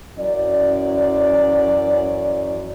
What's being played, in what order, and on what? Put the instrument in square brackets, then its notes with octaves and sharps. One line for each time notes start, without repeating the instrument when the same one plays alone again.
[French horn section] F#2 E3 C#4 D5